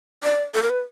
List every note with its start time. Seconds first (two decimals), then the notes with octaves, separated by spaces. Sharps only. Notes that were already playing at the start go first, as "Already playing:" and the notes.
0.24 D5
0.54 A4
0.62 A#4
0.70 B4